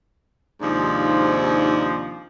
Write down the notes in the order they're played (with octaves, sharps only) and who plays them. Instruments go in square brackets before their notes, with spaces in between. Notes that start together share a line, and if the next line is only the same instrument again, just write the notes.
[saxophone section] D#2 G#2 C3 F3 D4 D#4